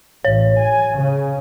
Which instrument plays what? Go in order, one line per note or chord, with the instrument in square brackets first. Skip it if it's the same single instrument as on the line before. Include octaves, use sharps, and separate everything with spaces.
[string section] A1 [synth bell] C#5
[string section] G#5
C#3